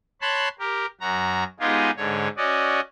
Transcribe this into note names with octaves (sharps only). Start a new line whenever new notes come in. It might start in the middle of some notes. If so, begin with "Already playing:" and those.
C#5 A5 B5 C6 F#6
G4 A#4
F#2 F#4 A#5
G#3 B3 D#4 F4 G4 G#4
G#2 D3 C#5
C#4 F#4 D5 D#5